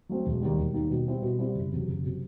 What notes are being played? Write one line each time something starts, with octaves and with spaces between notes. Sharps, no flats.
F#3 A3 C4
E1
D#2 D#3 G3
E1
D#2 D#3 G3
B2
G3 C4 E4
B2
G3 C4 E4
F#1
E2 C3 F#3
F#1
C3 F#3